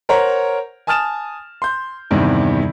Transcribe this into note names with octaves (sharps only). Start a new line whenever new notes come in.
A#4 C5 C#5 F#5 A#5
G#5 A5 D#6 F6 A6 E7
C6 G6
E2 G2 C3 D#3